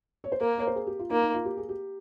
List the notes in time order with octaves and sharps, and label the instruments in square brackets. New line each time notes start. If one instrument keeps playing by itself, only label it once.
[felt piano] C#5
C5
[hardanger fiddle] A#3 [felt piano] A#4
[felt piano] C#5
C5
G#4
G4
F4
[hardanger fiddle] A#3 [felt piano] D#4
[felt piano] D#4
F4
G4
G#4
G4